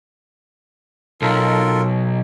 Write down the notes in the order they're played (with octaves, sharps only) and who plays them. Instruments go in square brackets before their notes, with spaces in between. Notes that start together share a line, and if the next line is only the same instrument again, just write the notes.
[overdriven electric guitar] B1 [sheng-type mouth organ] F4 A4 A#4